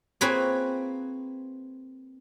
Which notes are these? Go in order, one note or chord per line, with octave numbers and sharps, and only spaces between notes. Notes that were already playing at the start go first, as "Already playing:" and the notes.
A#3 C4 F4 G#4 B4 C#5